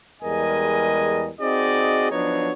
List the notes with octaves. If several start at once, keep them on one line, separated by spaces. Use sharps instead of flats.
E2 G3 G#3 A#4 D#5 G#5
C4 D#4 F#4 G#4 D5 D#5
F3 F#3 B3 D4 D#4 C#5